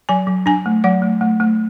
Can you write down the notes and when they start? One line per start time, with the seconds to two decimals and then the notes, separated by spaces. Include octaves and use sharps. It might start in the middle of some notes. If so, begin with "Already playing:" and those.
0.09 F#3 G#5
0.27 F#3
0.46 D4 G#5
0.66 A3
0.84 F#3 F#5
1.02 A3
1.21 A3
1.40 A3